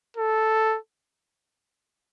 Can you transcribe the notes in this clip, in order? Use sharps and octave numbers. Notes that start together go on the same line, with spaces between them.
A4